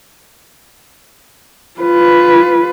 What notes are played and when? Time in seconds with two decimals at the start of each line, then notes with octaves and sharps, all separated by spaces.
1.81 F4 B4